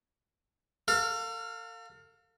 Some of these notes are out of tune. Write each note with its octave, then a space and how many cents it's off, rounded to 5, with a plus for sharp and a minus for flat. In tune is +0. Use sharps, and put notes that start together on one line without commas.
A4 +45 F5 +15